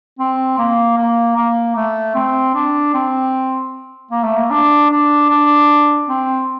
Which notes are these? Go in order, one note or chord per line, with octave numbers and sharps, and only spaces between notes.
C4
A#3
A#3
A#3
A3
C4
D4
C4
A#3
A3
A#3
D4
D4
D4
C4